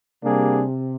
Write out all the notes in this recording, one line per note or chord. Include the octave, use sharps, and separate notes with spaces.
C3 G3 A#3 D4 G#4